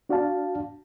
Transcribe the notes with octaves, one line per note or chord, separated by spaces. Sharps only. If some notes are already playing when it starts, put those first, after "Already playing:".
D4 F#4 D5 F5 A5